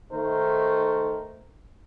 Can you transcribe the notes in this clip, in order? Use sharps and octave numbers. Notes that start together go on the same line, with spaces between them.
D#3 A3 D#4 A#4 C5